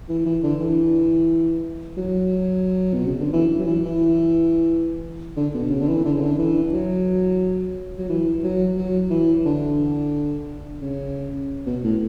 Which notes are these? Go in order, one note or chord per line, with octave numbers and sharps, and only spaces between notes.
E3
E3
D3
E3
F#3
B2
C#3
D3
E3
F#3
E3
E3
D3
B2
C#3
D3
E3
D3
C#3
D3
E3
F#3
F#3
E3
F#3
F#3
E3
D3
C#3
B2
A2